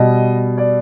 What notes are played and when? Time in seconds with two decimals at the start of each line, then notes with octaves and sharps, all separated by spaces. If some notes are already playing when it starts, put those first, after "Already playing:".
Already playing: B2 G3 D#5
0.58 D5